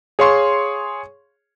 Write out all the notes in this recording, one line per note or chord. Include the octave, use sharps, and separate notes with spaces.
G#4 C#5 F5 C6 C#6